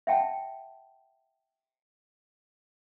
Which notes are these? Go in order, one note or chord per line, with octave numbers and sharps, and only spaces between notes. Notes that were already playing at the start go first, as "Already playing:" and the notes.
E5 F#5 G5 A5